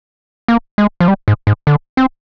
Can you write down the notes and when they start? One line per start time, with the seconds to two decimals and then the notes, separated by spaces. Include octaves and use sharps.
0.48 A#3
0.78 G#3
1.00 F3
1.08 G3
1.28 G#2
1.47 G#2
1.67 D3
1.97 C4